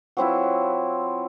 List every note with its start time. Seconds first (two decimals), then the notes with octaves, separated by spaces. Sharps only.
0.17 F#3 C4 E4 F4